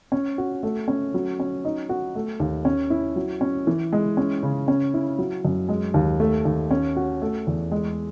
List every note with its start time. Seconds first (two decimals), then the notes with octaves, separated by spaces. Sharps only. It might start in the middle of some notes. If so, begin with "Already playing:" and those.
0.12 C#4
0.38 F#4
0.63 A3
0.88 C#4
1.14 F#3
1.39 C#4
1.65 D#4
1.89 F#4
2.15 A3
2.40 D#2
2.65 C#4
2.90 E4
3.16 F#3
3.41 C#4
3.67 E3
3.93 G#3
4.17 C#4
4.43 C#3
4.68 C#4
4.94 E4
5.18 F#3
5.45 F#2
5.69 G#3
5.94 D#2
6.20 A3
6.45 D#2
6.71 C#4
6.96 F#4
7.22 A3
7.47 E2
7.72 G#3